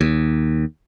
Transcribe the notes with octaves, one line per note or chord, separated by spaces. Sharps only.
D#2